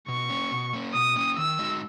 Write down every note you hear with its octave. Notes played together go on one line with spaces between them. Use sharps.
B2 C#6
A#3 C#4
B2
A#3 C#4
B2 D#6
A#3 C#4
D#3 E6
G#3 D#4 F#4